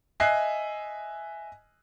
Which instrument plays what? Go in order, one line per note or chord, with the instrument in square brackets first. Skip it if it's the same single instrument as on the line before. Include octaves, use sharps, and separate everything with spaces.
[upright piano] D#5 E5 G#5 F#6 C7